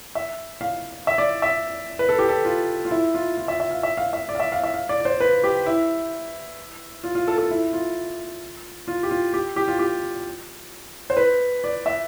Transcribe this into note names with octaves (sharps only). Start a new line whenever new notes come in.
E5
F5
E5
D5
E5
B4
A4
G4
A4
F4
F4
E4
F4
F4
E5
E5
F5
E5
F5
E5
D5
F5
E5
F5
E5
F5
D5
D5
C5
B4
G4
E4
F4
F4
A4
A4
E4
F4
F4
G4
F4
G4
G4
F4
G4
C5
B4
D5
E5